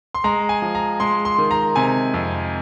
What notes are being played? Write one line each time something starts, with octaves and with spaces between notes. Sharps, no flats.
C6
G#3 A#5
G#5
F3
A#5
G#3 C6
C6
D#3
A#5
C3 G#5
F2